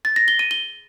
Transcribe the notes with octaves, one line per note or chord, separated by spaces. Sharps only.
A6
A#6
G7
D#7
G7